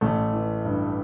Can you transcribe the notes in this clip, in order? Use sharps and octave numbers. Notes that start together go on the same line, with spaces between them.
A1 A3
E3
G2